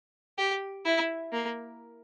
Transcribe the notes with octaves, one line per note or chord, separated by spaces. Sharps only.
G4
E4
A#3